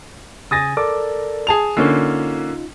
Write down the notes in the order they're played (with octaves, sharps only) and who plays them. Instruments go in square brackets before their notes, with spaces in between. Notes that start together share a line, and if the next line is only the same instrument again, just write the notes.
[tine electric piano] C#3 G#5 [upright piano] D#6 A6 A#6
[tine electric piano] A4 A#4 D5 [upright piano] D6
[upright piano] G#4 A5 F7
[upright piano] D3 A#3 C#4 [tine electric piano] D#4 F4